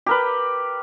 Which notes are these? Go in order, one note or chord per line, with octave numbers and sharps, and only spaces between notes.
G4 A#4 B4